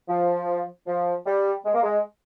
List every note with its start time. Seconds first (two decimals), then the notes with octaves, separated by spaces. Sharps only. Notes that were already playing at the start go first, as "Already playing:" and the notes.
0.08 F3
0.87 F3
1.26 G3
1.65 G#3
1.74 A#3
1.83 G#3